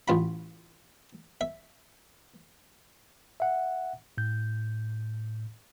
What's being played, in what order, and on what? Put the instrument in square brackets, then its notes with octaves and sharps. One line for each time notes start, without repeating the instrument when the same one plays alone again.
[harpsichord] A1 F4 B5
E5
[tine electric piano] E5 F#5
A2 G6